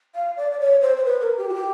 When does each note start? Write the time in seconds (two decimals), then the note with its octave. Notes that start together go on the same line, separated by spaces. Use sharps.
0.15 F5
0.37 D5
0.51 D5
0.59 C#5
0.81 C5
0.97 C5
1.05 B4
1.21 A#4
1.37 G4
1.49 F#4
1.54 G4